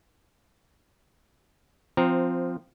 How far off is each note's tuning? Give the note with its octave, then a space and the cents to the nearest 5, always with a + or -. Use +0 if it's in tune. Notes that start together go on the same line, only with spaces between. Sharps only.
F3 +0 C4 -10 A#5 -10